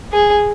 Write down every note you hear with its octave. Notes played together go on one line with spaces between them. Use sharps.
G#4